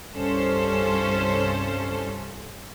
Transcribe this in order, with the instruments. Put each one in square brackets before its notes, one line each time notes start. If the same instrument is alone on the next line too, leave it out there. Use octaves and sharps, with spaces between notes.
[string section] C2 G2 C#4 A4 C5